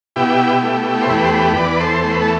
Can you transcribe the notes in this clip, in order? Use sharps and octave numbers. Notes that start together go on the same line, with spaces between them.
B2 E4 G4
A3
C5
E2 G4 B4
C5
G4 B4
E2 B4 D5
A4 C5
A3 C5
B4
A4